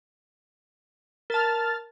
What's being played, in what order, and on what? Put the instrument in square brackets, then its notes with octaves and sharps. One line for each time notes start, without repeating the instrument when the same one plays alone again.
[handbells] A#4 A5 [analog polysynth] F6 A6